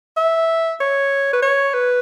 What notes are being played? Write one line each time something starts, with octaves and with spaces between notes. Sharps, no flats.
E5
C#5
B4
C#5
B4